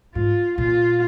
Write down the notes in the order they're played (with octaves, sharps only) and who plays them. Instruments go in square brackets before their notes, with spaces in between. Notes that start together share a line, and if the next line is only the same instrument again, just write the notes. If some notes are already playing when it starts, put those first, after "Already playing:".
[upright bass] G#2 [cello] F4
[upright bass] A#2 [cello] F4